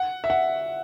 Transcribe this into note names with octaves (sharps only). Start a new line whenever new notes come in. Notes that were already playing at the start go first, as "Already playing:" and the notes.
Already playing: F#5
E5
F#5